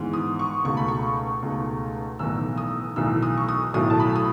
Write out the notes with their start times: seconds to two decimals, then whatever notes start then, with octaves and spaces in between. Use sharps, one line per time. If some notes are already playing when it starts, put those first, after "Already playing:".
Already playing: G#2 E3 B3
0.13 D#6
0.39 C#6
0.64 C#2 B2 A3 D#4 C#6
0.77 B5
0.88 C#6
1.42 C#2 B2 A3 D#4
2.19 B1 A2 E3 B3 D#4 E6
2.58 D#6
2.96 B1 A2 E3 B3 D#4 E6
3.23 D#6
3.37 C#6
3.49 D#6
3.74 B1 A2 F#3 A3 E4 D#6
3.90 A5
4.00 B5
4.16 D#6